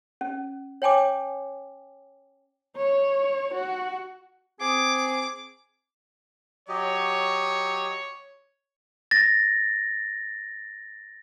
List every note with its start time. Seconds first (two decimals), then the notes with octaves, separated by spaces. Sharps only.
0.21 C#4
0.82 C#5 G5 G#5 D6
2.76 C#5
3.55 F#4
4.60 C4 G#4 D6
6.69 F#3 G4 C#5 D#5
9.11 A6 A#6